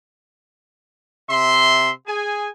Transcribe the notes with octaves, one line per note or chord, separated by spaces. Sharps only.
C3 E5 C6
G#4 G#5